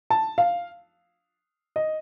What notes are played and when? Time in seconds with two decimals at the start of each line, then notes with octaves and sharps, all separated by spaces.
0.10 A5
0.38 F5
1.76 D#5